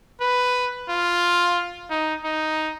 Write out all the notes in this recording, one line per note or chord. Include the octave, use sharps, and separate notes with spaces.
B4
F4
D#4
D#4